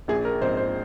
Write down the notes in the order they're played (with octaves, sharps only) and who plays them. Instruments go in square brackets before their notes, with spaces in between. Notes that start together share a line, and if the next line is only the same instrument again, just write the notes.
[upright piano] A#1 G#4
A#4
G#2 F3 C4 C5
C5